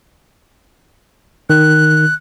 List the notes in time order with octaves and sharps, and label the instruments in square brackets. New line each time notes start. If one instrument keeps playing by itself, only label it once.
[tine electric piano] D#3 [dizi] F#6